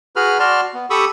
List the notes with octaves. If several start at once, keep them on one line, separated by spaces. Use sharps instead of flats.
F#4 G#4 B4 B5 F6
F#4 D5 A5 C6 F6
B3
G4 A4 B5 C#6 D#6 E6